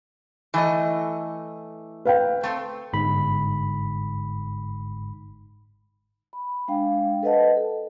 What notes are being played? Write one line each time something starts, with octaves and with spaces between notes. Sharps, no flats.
E3 A3 D#5
B4 F5 G5
A3 C4
G1 G#2 B5
B5
G#3 D4 F5 G5
A4 B4 C5 D#5 F#5 A5
A4